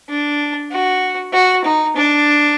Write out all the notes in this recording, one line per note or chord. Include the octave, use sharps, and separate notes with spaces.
D4
F#4
F#4
D#4
D4